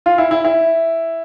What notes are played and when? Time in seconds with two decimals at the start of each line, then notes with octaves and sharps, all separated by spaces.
0.06 F4
0.18 E4
0.31 E4
0.45 E4